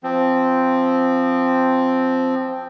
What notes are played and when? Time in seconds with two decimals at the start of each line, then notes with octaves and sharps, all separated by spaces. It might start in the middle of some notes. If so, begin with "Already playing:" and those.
0.04 F3 C4